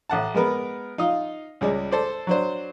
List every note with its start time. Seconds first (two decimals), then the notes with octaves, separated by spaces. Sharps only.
0.09 A1 F#5 A5
0.35 G#3 B3 A#4 B4
0.98 D#4 F4 D#5
1.61 C#2 G3 G#3
1.91 A4 C5 D5
2.27 F#3 D4 C5